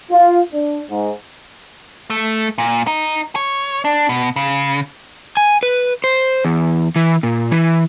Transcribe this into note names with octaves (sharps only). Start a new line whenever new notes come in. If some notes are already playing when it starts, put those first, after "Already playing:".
F4
D4
G#2
A3
A#2
D#4
C#5
D4
B2
C#3
G#5
B4
C5
E2
E3
A#2
E3